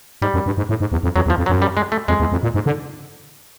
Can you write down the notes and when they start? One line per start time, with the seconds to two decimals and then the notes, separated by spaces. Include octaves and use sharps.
0.22 G#2 G3
0.34 F#2
0.46 G2
0.57 G#2
0.69 A2
0.80 G#2
0.92 E2
1.03 F2
1.15 F2 F#3
1.26 E2
1.30 F3
1.38 F2
1.46 F#3
1.50 F#2
1.62 G3
1.77 G#3
1.92 A3
2.08 F2 G#3
2.20 E2
2.32 F2
2.43 A#2
2.54 G#2
2.66 D3